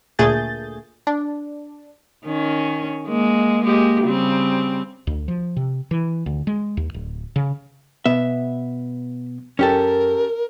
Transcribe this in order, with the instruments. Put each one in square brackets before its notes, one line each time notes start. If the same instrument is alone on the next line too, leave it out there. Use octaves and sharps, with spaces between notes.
[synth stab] D2 A#2 A3 G#4 G6 A6
D4
[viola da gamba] D#3 C#4
G#3 A#3
G#3 A#3 G4
C#3 G3 C4
[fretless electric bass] D2
F3
C3
E3
D2
G#3
D#2
D1
C#3
[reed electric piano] B2 B3 [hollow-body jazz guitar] E5
[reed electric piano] F#2 [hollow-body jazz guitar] C#4 G4 A4 [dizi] A#4